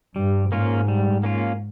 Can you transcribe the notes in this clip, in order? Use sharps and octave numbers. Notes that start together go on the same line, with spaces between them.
G2 G3
G#2 A#3 C#4 F4
G3
A#3 C#4 F4